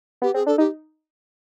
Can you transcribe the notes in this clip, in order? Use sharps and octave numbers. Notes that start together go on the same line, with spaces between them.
B3 G4
C4 G#4
D4 A4
D#4 G4